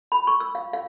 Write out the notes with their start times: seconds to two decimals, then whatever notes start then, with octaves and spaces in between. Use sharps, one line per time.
0.12 B5
0.27 C#6
0.40 E6
0.55 F5
0.73 F5